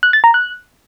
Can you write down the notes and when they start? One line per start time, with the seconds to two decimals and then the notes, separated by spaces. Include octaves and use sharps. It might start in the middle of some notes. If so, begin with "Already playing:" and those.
0.03 F#6
0.13 A6
0.24 A#5
0.34 F#6